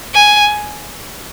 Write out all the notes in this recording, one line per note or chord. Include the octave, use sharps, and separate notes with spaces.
G#5